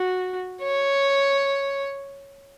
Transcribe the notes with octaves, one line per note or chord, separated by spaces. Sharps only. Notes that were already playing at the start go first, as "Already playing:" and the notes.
Already playing: F#4
C#5